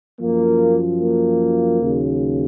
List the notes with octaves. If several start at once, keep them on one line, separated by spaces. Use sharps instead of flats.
F#2 F3 A#3
A#3
D#2 C#3 F#3